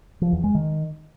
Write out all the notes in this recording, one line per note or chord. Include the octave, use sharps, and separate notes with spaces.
F3
E2
G#3
D#3